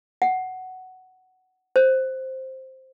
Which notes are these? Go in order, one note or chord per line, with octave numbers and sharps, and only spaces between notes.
F#5
C5